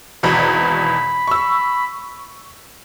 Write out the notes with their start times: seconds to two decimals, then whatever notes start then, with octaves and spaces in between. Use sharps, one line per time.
0.23 G#1 E2 B2 B5
1.28 C#6 E6